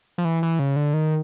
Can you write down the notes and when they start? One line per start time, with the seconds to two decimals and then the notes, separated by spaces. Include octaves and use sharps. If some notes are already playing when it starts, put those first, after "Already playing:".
0.18 F3
0.25 E3
0.43 E3
0.59 C#3
0.76 D3
0.94 D#3